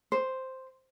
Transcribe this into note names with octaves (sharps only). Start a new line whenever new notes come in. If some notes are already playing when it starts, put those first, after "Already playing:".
C5